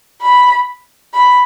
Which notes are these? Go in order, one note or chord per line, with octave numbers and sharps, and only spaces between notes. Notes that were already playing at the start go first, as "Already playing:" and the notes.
B5
B5